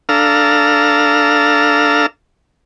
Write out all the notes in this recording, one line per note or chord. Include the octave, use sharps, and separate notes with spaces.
D4 A4 F5 A#5 E6 F6